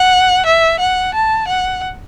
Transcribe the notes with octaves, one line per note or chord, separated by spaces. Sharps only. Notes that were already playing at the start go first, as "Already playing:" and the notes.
Already playing: F#5
E5
F#5
A5
F#5